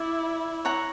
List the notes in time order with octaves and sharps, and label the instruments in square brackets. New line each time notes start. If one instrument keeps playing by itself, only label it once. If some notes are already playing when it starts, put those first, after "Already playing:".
Already playing: [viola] E4 [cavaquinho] D5
[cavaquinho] C#5 F#5 A#5